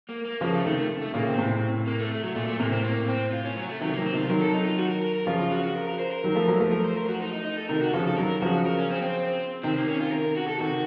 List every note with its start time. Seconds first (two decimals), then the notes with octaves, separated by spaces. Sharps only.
0.09 A#3
0.25 A#3
0.41 C#3 F3 A#3
0.54 A3
0.65 C3 D#3 A3
0.77 A3
1.02 A3
1.14 A#2 C#3 A#3
1.27 C4
1.38 A2 C3
1.87 A#3
1.99 A3
2.11 A3
2.23 F#3
2.35 A#2 A3
2.48 A3
2.59 A2 C3 A#3
2.72 C4
2.84 A#3
3.08 C4
3.33 F4
3.45 C#4
3.56 F#3
3.69 A3
3.81 C3 D#3 F#3
3.93 A#3
3.97 D#3 F#3
4.05 C4
4.13 C3 D#3 F4
4.30 D#3 F#3 A#4
4.41 A4
4.54 D#4
4.66 F4
4.78 F#4
4.90 A#4
5.02 A#4
5.14 A#4
5.26 C#3 F3 F4
5.39 F4
5.51 F#4
5.63 F#4
5.75 A#4
5.87 A#4
5.99 C5
6.12 A#4
6.24 D#3 F#3
6.35 F3 A3
6.48 F#3 A#3
6.60 F3 A3
6.72 A#4
6.84 C5
6.96 A#4
7.08 F#4
7.21 D#4
7.33 D#4
7.45 D#4
7.57 A4
7.69 C3 D#3 A#4
7.81 F#4
7.94 C#3 F3 A4
8.06 A4
8.18 D#3 F#3 A#4
8.42 C#3 F3 F#4
8.66 A#4
8.79 C#4
8.91 C4
9.02 C4
9.63 C3 D#3 C4
9.76 A#3
9.88 C#4
10.00 F4
10.12 A#4
10.36 F#4
10.48 A4
10.59 C3 D#3 F#4